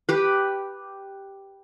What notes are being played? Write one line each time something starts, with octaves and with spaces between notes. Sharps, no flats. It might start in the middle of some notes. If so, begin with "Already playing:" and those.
G4 B4